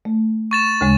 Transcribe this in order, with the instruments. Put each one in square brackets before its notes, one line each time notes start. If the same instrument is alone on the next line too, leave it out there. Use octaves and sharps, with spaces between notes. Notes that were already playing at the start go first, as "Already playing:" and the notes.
[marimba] A3
[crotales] C#6 A6 E7
[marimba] D2 C#3 G#3